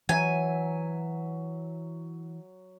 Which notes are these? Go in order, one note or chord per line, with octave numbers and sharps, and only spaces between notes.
E3 F#3 E5 G#5